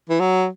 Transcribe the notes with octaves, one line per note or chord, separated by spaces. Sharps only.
E3
F#3